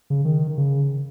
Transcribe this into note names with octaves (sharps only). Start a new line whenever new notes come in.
C#3
D#3
C#3